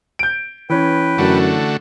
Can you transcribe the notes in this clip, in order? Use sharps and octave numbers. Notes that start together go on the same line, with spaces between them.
G6 D7
E3 C#4 B4 G5
F#2 D3 A3 F#4